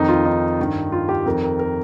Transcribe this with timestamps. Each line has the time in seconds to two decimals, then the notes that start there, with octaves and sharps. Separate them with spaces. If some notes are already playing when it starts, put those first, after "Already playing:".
Already playing: F2 D#3 D#4
0.09 F4
0.25 D#4
0.59 G2 D#3
0.92 F4
1.09 G4
1.25 F2 D#3 A#4
1.42 A#4
1.59 A#4